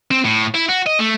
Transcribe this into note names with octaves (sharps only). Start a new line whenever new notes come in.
C4
A2
E4
F#4
D#5
A3